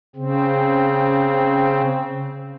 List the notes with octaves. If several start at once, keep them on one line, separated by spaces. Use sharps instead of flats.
C#3 C4